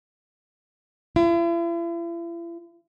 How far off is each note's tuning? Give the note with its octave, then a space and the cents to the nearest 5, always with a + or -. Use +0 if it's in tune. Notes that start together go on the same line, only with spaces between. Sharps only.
E4 +45